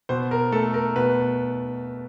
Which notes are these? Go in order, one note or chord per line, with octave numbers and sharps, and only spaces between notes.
B2 C5
A#4
A3 A4
A#4
B2 B4